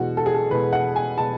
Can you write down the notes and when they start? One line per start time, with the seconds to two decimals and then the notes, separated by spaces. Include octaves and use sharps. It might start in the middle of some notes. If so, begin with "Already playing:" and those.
Already playing: E2 B2 G#3 F#4
0.17 A4
0.26 G#4
0.35 A4
0.51 E2 B2 G#3 B4
0.73 F#5
0.96 G#5
1.17 B2 G#3 A5